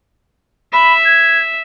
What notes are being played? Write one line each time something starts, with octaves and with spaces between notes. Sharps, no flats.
E5 B5
G#6